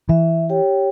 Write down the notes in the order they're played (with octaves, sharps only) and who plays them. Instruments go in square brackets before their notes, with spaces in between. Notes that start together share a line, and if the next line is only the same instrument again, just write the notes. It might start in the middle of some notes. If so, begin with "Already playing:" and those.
[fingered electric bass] E3 [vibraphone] E5
[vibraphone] G4 C#5 G5